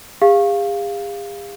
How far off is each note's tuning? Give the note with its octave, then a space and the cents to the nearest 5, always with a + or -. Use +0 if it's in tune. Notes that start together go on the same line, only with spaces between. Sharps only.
G#4 -45 F5 +0